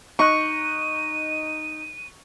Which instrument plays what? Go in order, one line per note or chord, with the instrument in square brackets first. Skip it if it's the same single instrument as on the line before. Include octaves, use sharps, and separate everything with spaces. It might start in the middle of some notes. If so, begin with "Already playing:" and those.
[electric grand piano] D#4 D#5 F#6 [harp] C#6 [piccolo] D#7